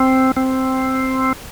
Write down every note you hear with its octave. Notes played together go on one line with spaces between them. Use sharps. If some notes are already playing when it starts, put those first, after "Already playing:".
Already playing: C4
C4